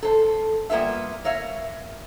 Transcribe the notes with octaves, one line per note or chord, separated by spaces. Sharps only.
A4 C5
G3 A#3 B3 F4 E5
A#4 C#5 E5 F5